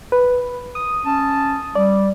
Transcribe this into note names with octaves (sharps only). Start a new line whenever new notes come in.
B4
D#6
C#4 A5
G3 D5